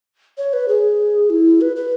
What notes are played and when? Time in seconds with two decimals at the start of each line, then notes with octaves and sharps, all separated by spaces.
0.38 C#5
0.53 B4
0.68 G#4
1.30 E4
1.61 B4
1.76 B4